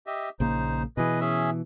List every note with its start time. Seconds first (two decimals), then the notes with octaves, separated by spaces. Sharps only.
0.07 G4 D#5 E5
0.40 A#1 C#3 A#3 D#4 C5
0.97 B2 E3 G#4 B4 D#5
1.20 C#4 G#4 E5